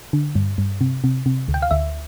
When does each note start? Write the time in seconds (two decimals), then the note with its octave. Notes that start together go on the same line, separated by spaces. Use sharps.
0.13 D3
0.35 G2
0.58 G2
0.81 C3
1.04 C3
1.26 C3
1.48 D2
1.54 G5
1.62 F5
1.71 D2 E5